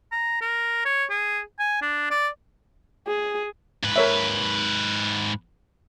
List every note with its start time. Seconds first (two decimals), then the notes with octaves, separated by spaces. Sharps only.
0.12 A#5
0.41 A#4
0.85 C#5
1.10 G#4
1.59 G#5
1.82 D4
2.11 D5
3.07 G#4
3.83 G#2 B4
3.96 A#4 C#5 E5